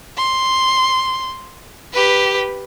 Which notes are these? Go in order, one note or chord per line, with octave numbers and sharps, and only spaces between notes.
C6
G4 B4